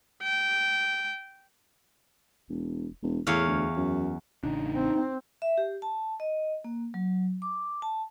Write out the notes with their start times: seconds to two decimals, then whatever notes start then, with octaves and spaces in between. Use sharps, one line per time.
0.22 G5
2.49 E1
3.03 E1
3.27 E2 A2 C#5 F5
3.47 D2
3.77 F#2
4.43 A1 C#3 D4 D#4
4.74 C4
5.42 E5
5.58 G4
5.82 A5
6.20 D#5
6.64 A#3
6.94 F#3
7.42 D6
7.82 A5